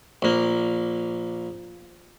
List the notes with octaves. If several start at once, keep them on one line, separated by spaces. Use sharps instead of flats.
A#1 A#3